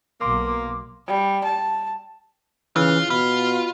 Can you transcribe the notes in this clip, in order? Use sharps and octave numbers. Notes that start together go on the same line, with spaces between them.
B1 A#3 C6 D6
G3
A5
C#3 E3 F4
B2 F4 B5